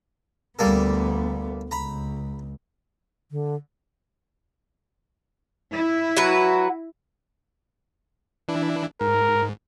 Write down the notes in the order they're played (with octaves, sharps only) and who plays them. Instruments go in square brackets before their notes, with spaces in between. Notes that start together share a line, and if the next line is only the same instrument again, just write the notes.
[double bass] D2 B3 [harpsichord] G3 A#3 A4
[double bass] C#2 [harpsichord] A#5 B5
[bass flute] D3
[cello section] E4
[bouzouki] F#3 F#4 B4
[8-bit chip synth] E3 D4 E4
[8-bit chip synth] G#2 [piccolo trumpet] A#4